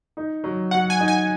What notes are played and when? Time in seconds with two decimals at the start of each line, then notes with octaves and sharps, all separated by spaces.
0.17 D#4
0.44 F#3
0.71 F#3 F#5
0.90 G#5
1.00 D#4
1.08 G#5